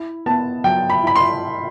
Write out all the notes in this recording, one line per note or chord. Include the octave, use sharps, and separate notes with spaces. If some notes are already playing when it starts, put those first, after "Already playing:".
Already playing: E4
B3 A5
F#3 G5
B5
E4 B5
C6